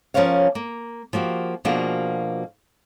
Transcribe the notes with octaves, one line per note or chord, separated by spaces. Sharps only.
F3 C#4 A#4 C5 C#5 F5
A#3
F3 A#3 F#4 G4
B2 F3 A#3 D4 F#4 G#4